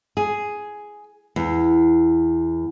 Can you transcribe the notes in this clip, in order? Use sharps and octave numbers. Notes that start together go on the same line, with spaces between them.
G#4
E2